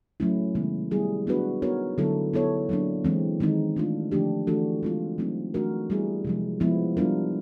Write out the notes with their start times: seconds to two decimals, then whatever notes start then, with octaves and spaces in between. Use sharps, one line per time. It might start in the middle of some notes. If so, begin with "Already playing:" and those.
0.20 F#3 A3 C#4 E4
0.55 C3 D#3 G#3 B3
0.91 G3 B3 E4 G#4
1.27 F#3 B3 D4 F#4 B4
1.62 B3 D#4 F#4 A#4 C#5
1.98 D3 F#3 B3 E4 A4
2.34 B3 E4 A4 C#5
2.69 F#3 A#3 D4
3.04 E3 G#3 C4
3.40 D#3 G#3 C4 D#4
3.76 A3 D4 F4
4.12 D3 F3 A3 D4 G4
4.47 E3 A3 D4 F#4 A4
4.83 G#3 C4 F4
5.18 F#3 A3 C4 D#4
5.54 E3 A3 D4 F#4 A#4
5.90 G3 B3 E4 G#4
6.25 C3 F3 G#3
6.60 F3 G#3 B3 E4
6.97 G3 B3 D4 F4 A#4